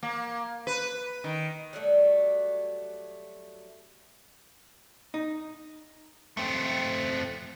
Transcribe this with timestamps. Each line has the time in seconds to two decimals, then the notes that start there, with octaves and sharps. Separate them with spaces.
0.03 A#3
0.67 B4
1.24 D#3
1.73 F#3 G3 A3
5.14 D#4
6.37 A3 C4